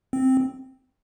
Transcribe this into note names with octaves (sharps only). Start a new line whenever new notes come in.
C4